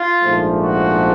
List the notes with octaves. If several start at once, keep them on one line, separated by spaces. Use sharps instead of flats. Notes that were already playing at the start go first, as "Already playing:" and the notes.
Already playing: F4
A#1 G#2 F3 A3
F#4